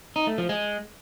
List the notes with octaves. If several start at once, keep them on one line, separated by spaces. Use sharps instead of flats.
D#4
A3
F3
G#3